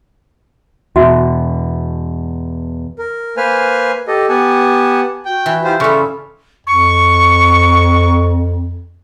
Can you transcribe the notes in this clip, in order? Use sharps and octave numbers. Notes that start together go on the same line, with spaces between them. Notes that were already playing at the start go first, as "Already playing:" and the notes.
E2 B2 F#4 E5
A#4
A#3 B4 C5 G#5 F6
G4 A4 D#5
B3 G4 F#5 G#5 A5
F#4 G5
E3
E4 F4 G4 C5
C#3 G3 A4 E5 C6 C#6 F6
F2 C#6